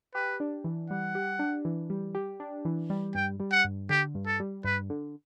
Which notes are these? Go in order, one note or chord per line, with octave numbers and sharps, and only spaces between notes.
G4 B4
D4
E3
G3 F#5
G4
D4
E3
G3
G4
D4
E3
G3
G2 G5
G3
F#5
G2
D3 G4
G2
A4
G3
G2 B4
D3